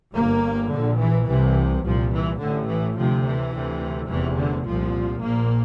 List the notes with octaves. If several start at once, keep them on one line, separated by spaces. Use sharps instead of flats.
G1 G2 A#3
A#1 A#2 D3
E3
C2 C3 E3
C2 A#2 F3
E3
A1 A2 D3
E3
D2 C3 F3
E3
D2 C3
F1 E2 C3 E3
D3
C2 A#2 F3
A#1 A#2 A#3